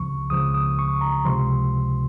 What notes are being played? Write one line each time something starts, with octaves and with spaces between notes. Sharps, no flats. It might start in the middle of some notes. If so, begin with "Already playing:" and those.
Already playing: C#2 C#3 F3 C#6
C#2 C#3 F3 D#6
D#6
C#6
A#5
C#2 C3 F3 C6